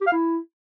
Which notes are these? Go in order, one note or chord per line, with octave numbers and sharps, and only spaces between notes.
G4
F5
E4